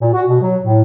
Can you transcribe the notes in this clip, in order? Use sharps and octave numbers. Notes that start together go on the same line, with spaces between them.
A#2
F#4
B2
F#3
A2